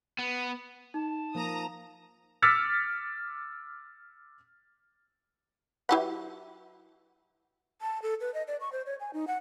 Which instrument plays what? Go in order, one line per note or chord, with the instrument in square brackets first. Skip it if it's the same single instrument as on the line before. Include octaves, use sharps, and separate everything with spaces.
[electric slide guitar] B3
[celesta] D#4 [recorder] A5
[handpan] F3 A#3 [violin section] A#5 D#6
[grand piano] D6 E6 F6 A6 B6 C#7
[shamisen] F#3 G4 F#5 [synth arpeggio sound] E4 B4
[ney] A5
A4
B4
D#5
D5
C#6
C5
C#5
G#5
D#4
F#5